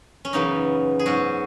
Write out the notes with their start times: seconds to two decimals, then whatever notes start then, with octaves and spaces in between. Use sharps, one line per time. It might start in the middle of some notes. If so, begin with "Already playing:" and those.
0.25 C#4
0.33 F#2 C#3 E3 B3 D#4
0.99 G#4
1.06 G#2 F#3 B3 F#4